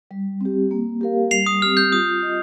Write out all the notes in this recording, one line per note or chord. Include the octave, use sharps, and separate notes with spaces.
G3
C4 G4
A#3
G4 A#4 F5
G3 C7 F7
D#6
C4 G4 F6
G6
F4 D#6
D#5